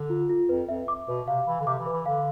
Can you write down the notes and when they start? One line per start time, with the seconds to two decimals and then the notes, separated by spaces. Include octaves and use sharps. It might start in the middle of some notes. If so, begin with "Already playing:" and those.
Already playing: D3
0.10 F4
0.29 F4
0.49 F2 B4
0.69 F2 E5
0.88 D6
1.08 B2 B4
1.27 C3 F5
1.47 E3 B5
1.61 D3
1.67 C3 D6
1.80 E3
1.86 B4
1.93 E3
2.06 D3 F5